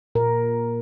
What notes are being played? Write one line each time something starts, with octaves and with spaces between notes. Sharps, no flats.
A#2 A#4